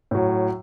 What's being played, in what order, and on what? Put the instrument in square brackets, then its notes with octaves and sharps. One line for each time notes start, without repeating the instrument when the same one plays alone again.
[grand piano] A2 F#3